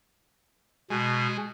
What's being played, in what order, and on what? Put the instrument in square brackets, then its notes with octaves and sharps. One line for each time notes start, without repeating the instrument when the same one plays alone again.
[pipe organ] B2 [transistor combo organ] G#3